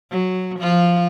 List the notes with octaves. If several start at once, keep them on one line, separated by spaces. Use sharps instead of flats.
F#3
F3 F4